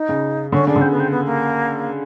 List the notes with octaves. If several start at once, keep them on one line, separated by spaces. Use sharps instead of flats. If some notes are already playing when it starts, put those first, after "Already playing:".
Already playing: D#4
C#3
D3 C#4
C#3 D4
D3
C#3 C4
B3
C4
B3
A#3